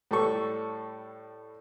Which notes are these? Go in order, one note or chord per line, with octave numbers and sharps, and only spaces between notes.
A2 G3 A4 C#6